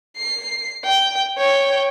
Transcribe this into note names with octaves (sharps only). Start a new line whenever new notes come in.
C7
G5
C#5 G5